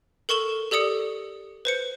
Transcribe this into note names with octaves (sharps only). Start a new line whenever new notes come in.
A4 A#4 C#6 E7 G7
G4 A4 D5 D#6 C#7
B4 C5 C#7